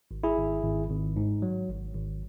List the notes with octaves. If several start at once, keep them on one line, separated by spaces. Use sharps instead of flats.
G#1
E4 G#4
G#1
G#1
G#1
G#2
F#3
G#1
G#1